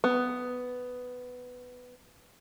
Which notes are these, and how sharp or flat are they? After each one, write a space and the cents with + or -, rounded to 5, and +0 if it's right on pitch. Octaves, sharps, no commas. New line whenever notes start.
B3 +10